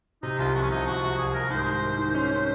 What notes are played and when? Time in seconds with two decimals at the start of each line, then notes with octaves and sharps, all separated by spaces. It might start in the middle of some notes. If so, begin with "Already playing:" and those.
0.23 C3 D#4
0.39 C2 F4
0.55 F3 F#4
0.62 C#4
0.70 C2 D#4
0.86 C2 F#4
1.02 C2 F#4
1.18 C2 G#4
1.34 C2 A#4
1.50 G#2 C5
1.67 D#3
1.83 D#3
1.99 D#3
2.14 C#4
2.31 C#4